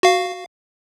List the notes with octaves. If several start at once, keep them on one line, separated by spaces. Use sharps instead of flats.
F#4 F5